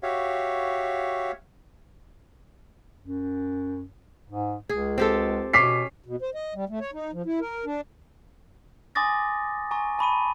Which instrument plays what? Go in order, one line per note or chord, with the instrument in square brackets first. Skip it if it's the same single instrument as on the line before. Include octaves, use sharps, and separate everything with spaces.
[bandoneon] F#4 G4 C#5 E5 F5
[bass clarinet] F#2
G#2
[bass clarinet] C#2 [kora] G#4
[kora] C4 G4 A4
[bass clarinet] B2 [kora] C#4 [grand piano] D6 B6 C7
[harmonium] B2
C5
D#5
G3
A3
C#5
D#4
F3
E4
A#4
D4
[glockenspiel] G#5 C6 D6 D#6 A6 A#6
G#5 A#5 C#6
A5 B5 C#6 D#7